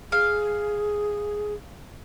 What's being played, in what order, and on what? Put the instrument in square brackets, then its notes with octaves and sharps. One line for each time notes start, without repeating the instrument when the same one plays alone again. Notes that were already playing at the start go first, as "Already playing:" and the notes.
[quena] G#4 [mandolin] F5